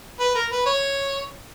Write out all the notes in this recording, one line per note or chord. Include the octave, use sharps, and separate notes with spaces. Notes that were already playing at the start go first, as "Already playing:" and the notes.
B4
A#4
B4
C#5